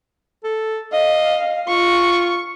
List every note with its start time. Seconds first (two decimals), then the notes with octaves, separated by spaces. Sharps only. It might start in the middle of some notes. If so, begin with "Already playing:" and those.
0.44 A4
0.93 D#5 F5
1.68 F4 C#6